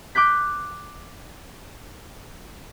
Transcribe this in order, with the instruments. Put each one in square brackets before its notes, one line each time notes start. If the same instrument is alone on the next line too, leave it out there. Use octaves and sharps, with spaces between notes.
[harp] D6 F#6 G6 B6